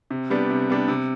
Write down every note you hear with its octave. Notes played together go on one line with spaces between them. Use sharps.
C3
G3 B3 D4
C3
G3 B3 D4
C3